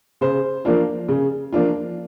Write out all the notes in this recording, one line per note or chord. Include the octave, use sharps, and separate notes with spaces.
C#3 C5
F3 A#3 D4 F4
C#3
F3 A#3 D4 F4